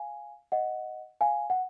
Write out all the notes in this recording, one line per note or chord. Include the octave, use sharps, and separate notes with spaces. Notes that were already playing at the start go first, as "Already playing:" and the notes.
Already playing: F5 G#5
D#5 F#5
F5 G#5
F#5